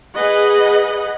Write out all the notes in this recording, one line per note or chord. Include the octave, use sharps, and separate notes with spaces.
G#4 B4 D#5 F#5